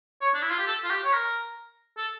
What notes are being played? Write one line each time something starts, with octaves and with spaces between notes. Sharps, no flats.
C#5
D4
E4
F4
G4
A4
F4
G4
C#5
A#4
A4